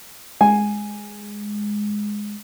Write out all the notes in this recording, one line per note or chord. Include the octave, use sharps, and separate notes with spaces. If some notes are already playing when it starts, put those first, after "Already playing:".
G#3 G#5